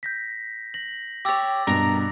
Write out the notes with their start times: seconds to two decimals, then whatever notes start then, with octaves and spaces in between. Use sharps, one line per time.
0.03 G6 A#6 B6
0.74 A#6 F#7
1.25 G4 C#5 D6 E6 A6
1.67 G2 B2 A#4 A#5 A#6